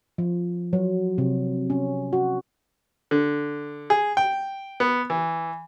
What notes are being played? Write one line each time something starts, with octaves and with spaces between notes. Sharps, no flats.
F3
F#3
C3
C#4
F#4
D3
G#4
G5
B3
E3